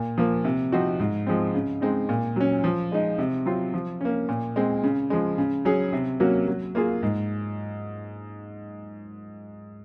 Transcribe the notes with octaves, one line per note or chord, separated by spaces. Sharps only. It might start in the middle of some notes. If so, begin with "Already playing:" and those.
Already playing: A#2
F3 A#3
C3
F3 C4 D#4 F#4
G#2
F3 G#3 C4
C#3
G#3 C4 D#4
A#2
F#3 C#4
F3
G#3 D#4
C3
F#3 C4 F4
F3
A#3 C#4
A#2
G#3 C4
C#3
F3 G#3
C#3
F#3 C#4 G#4
C3
F#3 A#3 C#4 F#4
F#3
A#3 F4 G#4
G#2